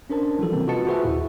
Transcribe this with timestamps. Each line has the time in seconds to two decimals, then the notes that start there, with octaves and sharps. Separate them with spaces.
0.10 C#4 D4 A#4 C5 A5
0.39 E3 F3 G3 F#4 A4
0.52 C3 A#3 C4 A#4
0.68 F4 F#4 B4 D#5 A5 C#7
0.86 F4 F#4 G#4 B4 C5 E5
1.03 D#2 A#2 E4